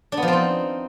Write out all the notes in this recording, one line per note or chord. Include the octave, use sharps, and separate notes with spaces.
D4
B3
F3
C4
D#4